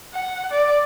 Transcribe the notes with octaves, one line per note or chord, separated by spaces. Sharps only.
F#5
D5